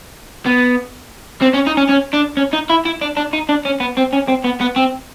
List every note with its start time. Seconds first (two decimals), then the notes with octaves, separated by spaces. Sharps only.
0.46 B3
1.41 C4
1.53 C#4
1.66 D#4
1.77 C#4
1.89 C#4
2.14 D4
2.37 C#4
2.53 D#4
2.69 E4
2.85 E4
3.01 D4
3.17 D4
3.33 D#4
3.49 D4
3.65 C#4
3.80 B3
3.97 C4
4.13 C#4
4.28 C4
4.44 B3
4.60 B3
4.76 C4